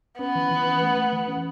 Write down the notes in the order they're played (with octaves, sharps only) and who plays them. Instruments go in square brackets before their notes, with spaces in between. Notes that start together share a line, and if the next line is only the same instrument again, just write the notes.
[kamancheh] B3 [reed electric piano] C#4
[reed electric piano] E3
E3
C#4
A3
A3
E3
C#4